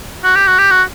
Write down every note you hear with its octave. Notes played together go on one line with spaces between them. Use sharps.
F#4
G4
F#4
G4
F#4